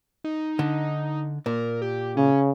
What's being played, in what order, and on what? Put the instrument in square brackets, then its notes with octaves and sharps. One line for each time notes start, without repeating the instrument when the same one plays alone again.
[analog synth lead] D#4
[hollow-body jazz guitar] D3
[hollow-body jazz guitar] A#2 [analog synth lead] A#4
[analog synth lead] G4
[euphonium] C#3 [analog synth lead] C#4